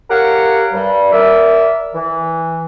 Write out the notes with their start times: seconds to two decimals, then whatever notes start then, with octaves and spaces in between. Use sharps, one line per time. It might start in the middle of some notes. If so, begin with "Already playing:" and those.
0.10 G4 A#4 C#5 F5 F#5
0.73 G2 G3
1.12 A#4 D5 E5
1.94 E3